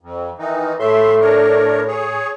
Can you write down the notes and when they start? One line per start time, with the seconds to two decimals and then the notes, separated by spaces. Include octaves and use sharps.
0.01 F2
0.39 D#3 E3 D#4
0.79 A2 E5 C6
1.21 D4 A#4 C#5
1.88 G#4 C#5